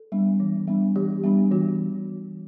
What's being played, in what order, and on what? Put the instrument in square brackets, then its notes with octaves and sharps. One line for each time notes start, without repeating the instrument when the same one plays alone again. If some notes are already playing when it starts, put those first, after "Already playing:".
Already playing: [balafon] A4
G3 B3 D4
E3
G3 B3 D4
E3 G4
G3 B3 D4
E3 F#4